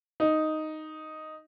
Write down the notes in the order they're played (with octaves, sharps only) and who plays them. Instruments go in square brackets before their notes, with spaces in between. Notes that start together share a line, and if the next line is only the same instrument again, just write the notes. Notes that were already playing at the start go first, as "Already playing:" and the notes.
[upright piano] D#4